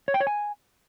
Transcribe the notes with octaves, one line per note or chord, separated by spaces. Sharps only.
C#5
G5
C#5
G#5